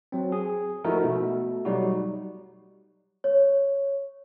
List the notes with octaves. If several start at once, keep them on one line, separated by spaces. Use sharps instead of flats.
F#3 C4
G#4
F3 A3 D#4 E4 F#4 A#4
B2 A3
F#3 G3 D#4 F#4
C#5